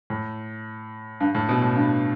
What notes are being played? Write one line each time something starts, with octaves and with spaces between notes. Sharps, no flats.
A2
G2
A2
B2
A2
G2